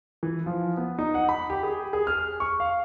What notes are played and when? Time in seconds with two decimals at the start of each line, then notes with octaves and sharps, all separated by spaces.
0.23 E3
0.46 F3
0.77 B3
0.99 D#4
1.14 F#5
1.29 B5
1.50 G4
1.63 G#4
1.93 G#4
2.07 F6
2.40 C#6
2.60 F5